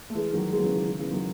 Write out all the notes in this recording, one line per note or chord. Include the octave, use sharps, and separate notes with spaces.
A3
E3 G#3
D#3 F#3
E3 G#3
F#3
C#3 E3
D#3
D#3
C#3 E3
D#3 F#3